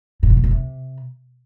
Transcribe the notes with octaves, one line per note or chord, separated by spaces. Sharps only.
A2
C#3
A#2
B2
C3